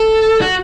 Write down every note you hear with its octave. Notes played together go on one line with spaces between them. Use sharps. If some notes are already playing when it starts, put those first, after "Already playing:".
Already playing: A4
F#4